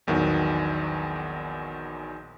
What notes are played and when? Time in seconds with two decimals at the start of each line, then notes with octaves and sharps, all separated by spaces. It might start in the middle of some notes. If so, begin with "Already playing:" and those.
0.07 A#1 E2 D#3 F#3